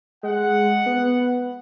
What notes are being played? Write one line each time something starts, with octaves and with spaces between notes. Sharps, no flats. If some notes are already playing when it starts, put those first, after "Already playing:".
G#3 F#5
B3